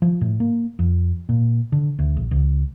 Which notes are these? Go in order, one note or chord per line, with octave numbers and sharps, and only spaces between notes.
F3
A2
A#3
F2
A#2
D3
D2
A#1
C#2